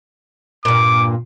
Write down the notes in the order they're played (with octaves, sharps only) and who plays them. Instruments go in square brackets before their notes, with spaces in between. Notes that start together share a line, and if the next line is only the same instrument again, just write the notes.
[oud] G2 A#2 [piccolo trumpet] D6